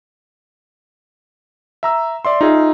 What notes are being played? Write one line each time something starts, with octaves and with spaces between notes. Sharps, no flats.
E5 A#5 E6
D5 E5 C6
D#4 F4 G#4 E5